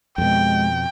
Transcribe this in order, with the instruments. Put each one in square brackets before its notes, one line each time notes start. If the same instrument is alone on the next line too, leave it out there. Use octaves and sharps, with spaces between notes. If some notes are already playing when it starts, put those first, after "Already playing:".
[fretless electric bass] F2 B2 [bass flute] G#3 [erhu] G5